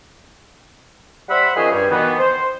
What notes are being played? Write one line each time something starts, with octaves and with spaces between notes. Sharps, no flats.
G3 C5 E5 F#5 B5
D#3 F3 C#4 G#4 C5 D#5
G2 G3 G#5
B2 D#3 E3 B3
C5